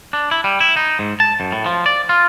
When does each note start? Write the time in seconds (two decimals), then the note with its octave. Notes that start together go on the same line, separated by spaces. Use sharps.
0.13 D4
0.31 E4
0.44 G3
0.61 E4
0.76 D#4
0.99 G#2
1.20 A5
1.40 F#2
1.52 A2
1.66 F3
1.86 D5
2.09 F4